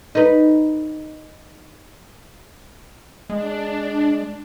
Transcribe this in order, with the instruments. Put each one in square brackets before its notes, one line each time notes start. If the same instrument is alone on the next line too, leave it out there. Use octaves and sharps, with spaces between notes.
[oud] D#4 B4
[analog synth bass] G#3 [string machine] D4